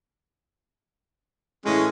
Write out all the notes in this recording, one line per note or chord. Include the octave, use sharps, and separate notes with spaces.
A2 E3 G#3 C#4 F#5